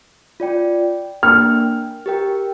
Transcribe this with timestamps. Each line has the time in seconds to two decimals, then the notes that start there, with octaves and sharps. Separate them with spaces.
0.40 F4 D5 G5
1.23 A#3 D4 A#4 G5 F6
2.06 G4 A#4 G5